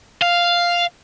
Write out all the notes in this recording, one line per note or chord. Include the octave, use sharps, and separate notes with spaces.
F5